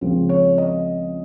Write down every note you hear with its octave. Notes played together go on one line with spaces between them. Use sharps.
C#2 C#3 F3 C4
C#5
D#5